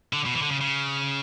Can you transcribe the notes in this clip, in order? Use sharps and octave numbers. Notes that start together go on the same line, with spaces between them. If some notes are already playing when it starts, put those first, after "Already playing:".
D3
B2
E3
D3
C#3
C#3